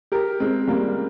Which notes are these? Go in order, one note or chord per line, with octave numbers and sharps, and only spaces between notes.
G4 A#4
G#3 C4
G3 A#3